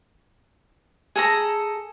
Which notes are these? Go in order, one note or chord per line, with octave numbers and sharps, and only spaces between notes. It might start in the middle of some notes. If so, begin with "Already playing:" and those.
G#4 A4 A#5